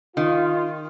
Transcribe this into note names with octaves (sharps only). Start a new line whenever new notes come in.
D#3 F4